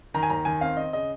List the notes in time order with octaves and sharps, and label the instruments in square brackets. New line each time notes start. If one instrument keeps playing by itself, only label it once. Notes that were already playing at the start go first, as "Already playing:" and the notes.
[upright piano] D#3 A#5
G#5
D#2 A#5
D#3 G#5
C4 F5
C4 D#5
C#3 D#5